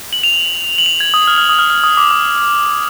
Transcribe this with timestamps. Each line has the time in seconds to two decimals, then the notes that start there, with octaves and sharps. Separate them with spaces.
0.13 F#7
0.23 F7
0.78 F#7
0.86 F7
1.00 G#6
1.14 D#6
1.27 F6
1.38 F6
1.49 D#6
1.59 F6
1.70 F6
1.84 D#6
1.97 D6
2.11 D#6